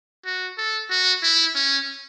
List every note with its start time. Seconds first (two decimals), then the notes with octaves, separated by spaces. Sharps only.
0.25 F#4
0.57 A4
0.90 F#4
1.23 E4
1.55 C#4